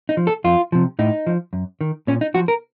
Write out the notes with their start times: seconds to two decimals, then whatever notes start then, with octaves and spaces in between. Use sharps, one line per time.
0.09 D#4
0.17 F3
0.27 A4
0.44 F2 F4
0.72 C3 F3
0.99 A2 D#4
1.27 F3
1.53 F#2
1.81 D#3
2.07 A#2 C#4
2.21 D#4
2.34 F3 F#4
2.48 A#4